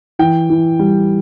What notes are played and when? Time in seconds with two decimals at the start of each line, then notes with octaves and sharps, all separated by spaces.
0.19 E3 G5
0.50 E3
0.79 G3